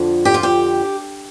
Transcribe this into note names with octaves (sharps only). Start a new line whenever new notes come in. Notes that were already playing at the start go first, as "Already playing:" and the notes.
Already playing: F2 D3 F3
G4
F4
G4